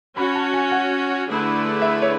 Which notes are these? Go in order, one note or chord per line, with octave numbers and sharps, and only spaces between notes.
C#4 F#4 C#5 B5
A5
G#5
F#5
D3 A3 E4 G#4 B4
E5
C#5